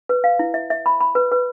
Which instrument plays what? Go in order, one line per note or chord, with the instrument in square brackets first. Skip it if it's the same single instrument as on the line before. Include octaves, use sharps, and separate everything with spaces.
[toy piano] B4
F5
E4
E5
E5
B5
B5
B4
B4